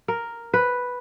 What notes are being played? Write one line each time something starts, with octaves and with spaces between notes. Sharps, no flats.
A#4
B4